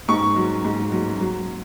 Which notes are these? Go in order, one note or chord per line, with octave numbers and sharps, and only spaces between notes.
G#2 C#6
F#3
G#2
F#3
F#3